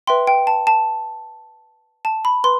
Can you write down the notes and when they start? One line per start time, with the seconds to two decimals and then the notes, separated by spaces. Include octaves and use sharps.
0.07 B4 E5 G5 C6
0.27 G5
0.47 A5
0.67 A5
2.05 A5
2.25 B5
2.44 B4 C6